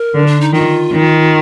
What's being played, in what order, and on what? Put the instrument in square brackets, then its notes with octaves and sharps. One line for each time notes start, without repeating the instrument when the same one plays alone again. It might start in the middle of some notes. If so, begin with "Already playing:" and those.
Already playing: [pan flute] A#4
[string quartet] D3
[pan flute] D4
D#4
[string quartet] D#3 [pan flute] F4
[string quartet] D#3